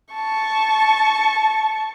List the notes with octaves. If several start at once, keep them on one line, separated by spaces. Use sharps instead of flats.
A5 C#6